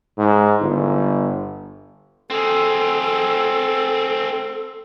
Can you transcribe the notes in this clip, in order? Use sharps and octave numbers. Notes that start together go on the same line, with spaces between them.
G#2
G1
C4 G#4 A4